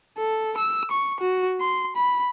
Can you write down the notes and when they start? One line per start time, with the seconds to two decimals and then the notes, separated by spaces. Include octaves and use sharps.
0.17 A4
0.58 E6
0.91 C#6
1.21 F#4
1.61 C6
1.96 B5